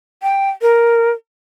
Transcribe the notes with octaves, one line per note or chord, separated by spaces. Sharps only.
G5
A#4